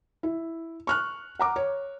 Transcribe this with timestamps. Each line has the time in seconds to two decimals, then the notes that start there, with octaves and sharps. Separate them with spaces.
0.23 E4
0.87 C#6 F6 F#6
1.39 F#5 A#5 D6
1.56 C#5